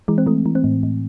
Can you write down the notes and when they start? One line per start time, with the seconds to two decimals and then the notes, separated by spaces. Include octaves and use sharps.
0.08 E3 G#3
0.18 C4
0.26 E3 A3
0.46 E3
0.55 C4
0.64 A2
0.83 A2